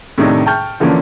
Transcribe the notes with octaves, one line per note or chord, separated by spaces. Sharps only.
A2 C3 D#3 D4 D#4
G5 A5 C#6 F6 G6
D3 E3 F3 A#3 C#4 D4